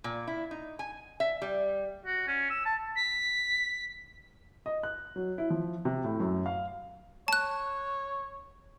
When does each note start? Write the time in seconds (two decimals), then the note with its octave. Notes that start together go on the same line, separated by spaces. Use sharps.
0.04 A#2
0.27 E4
0.51 D#4
0.79 G#5
1.20 E5
1.42 G3
2.06 F#4
2.28 C#4
2.50 E6
2.66 A5
2.95 B6
4.66 D#5
4.83 F#6
5.16 F#3
5.38 E4
5.50 F3
5.85 C3
6.04 A2
6.20 F#2
6.46 F5
7.28 C#5 A5 F#6